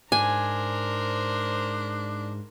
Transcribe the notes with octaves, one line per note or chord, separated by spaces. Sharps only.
G#2 D4 A#4 C5 G#5